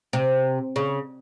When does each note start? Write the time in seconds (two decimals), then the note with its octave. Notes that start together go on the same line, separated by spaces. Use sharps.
0.13 C3
0.76 C#3